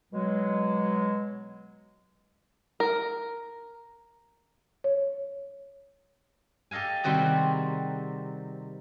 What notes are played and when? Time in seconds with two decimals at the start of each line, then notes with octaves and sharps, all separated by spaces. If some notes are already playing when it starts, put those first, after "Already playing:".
0.12 B2 F#3 G#3
2.80 A#4
4.84 C#5
6.71 G4 A4 D#5 F5 G#5
7.04 C3 D#3 G3 C4 F#4 G#4